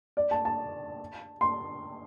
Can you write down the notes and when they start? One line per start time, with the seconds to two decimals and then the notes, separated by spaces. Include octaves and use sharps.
0.17 D5
0.31 A5
0.45 A5
1.41 C6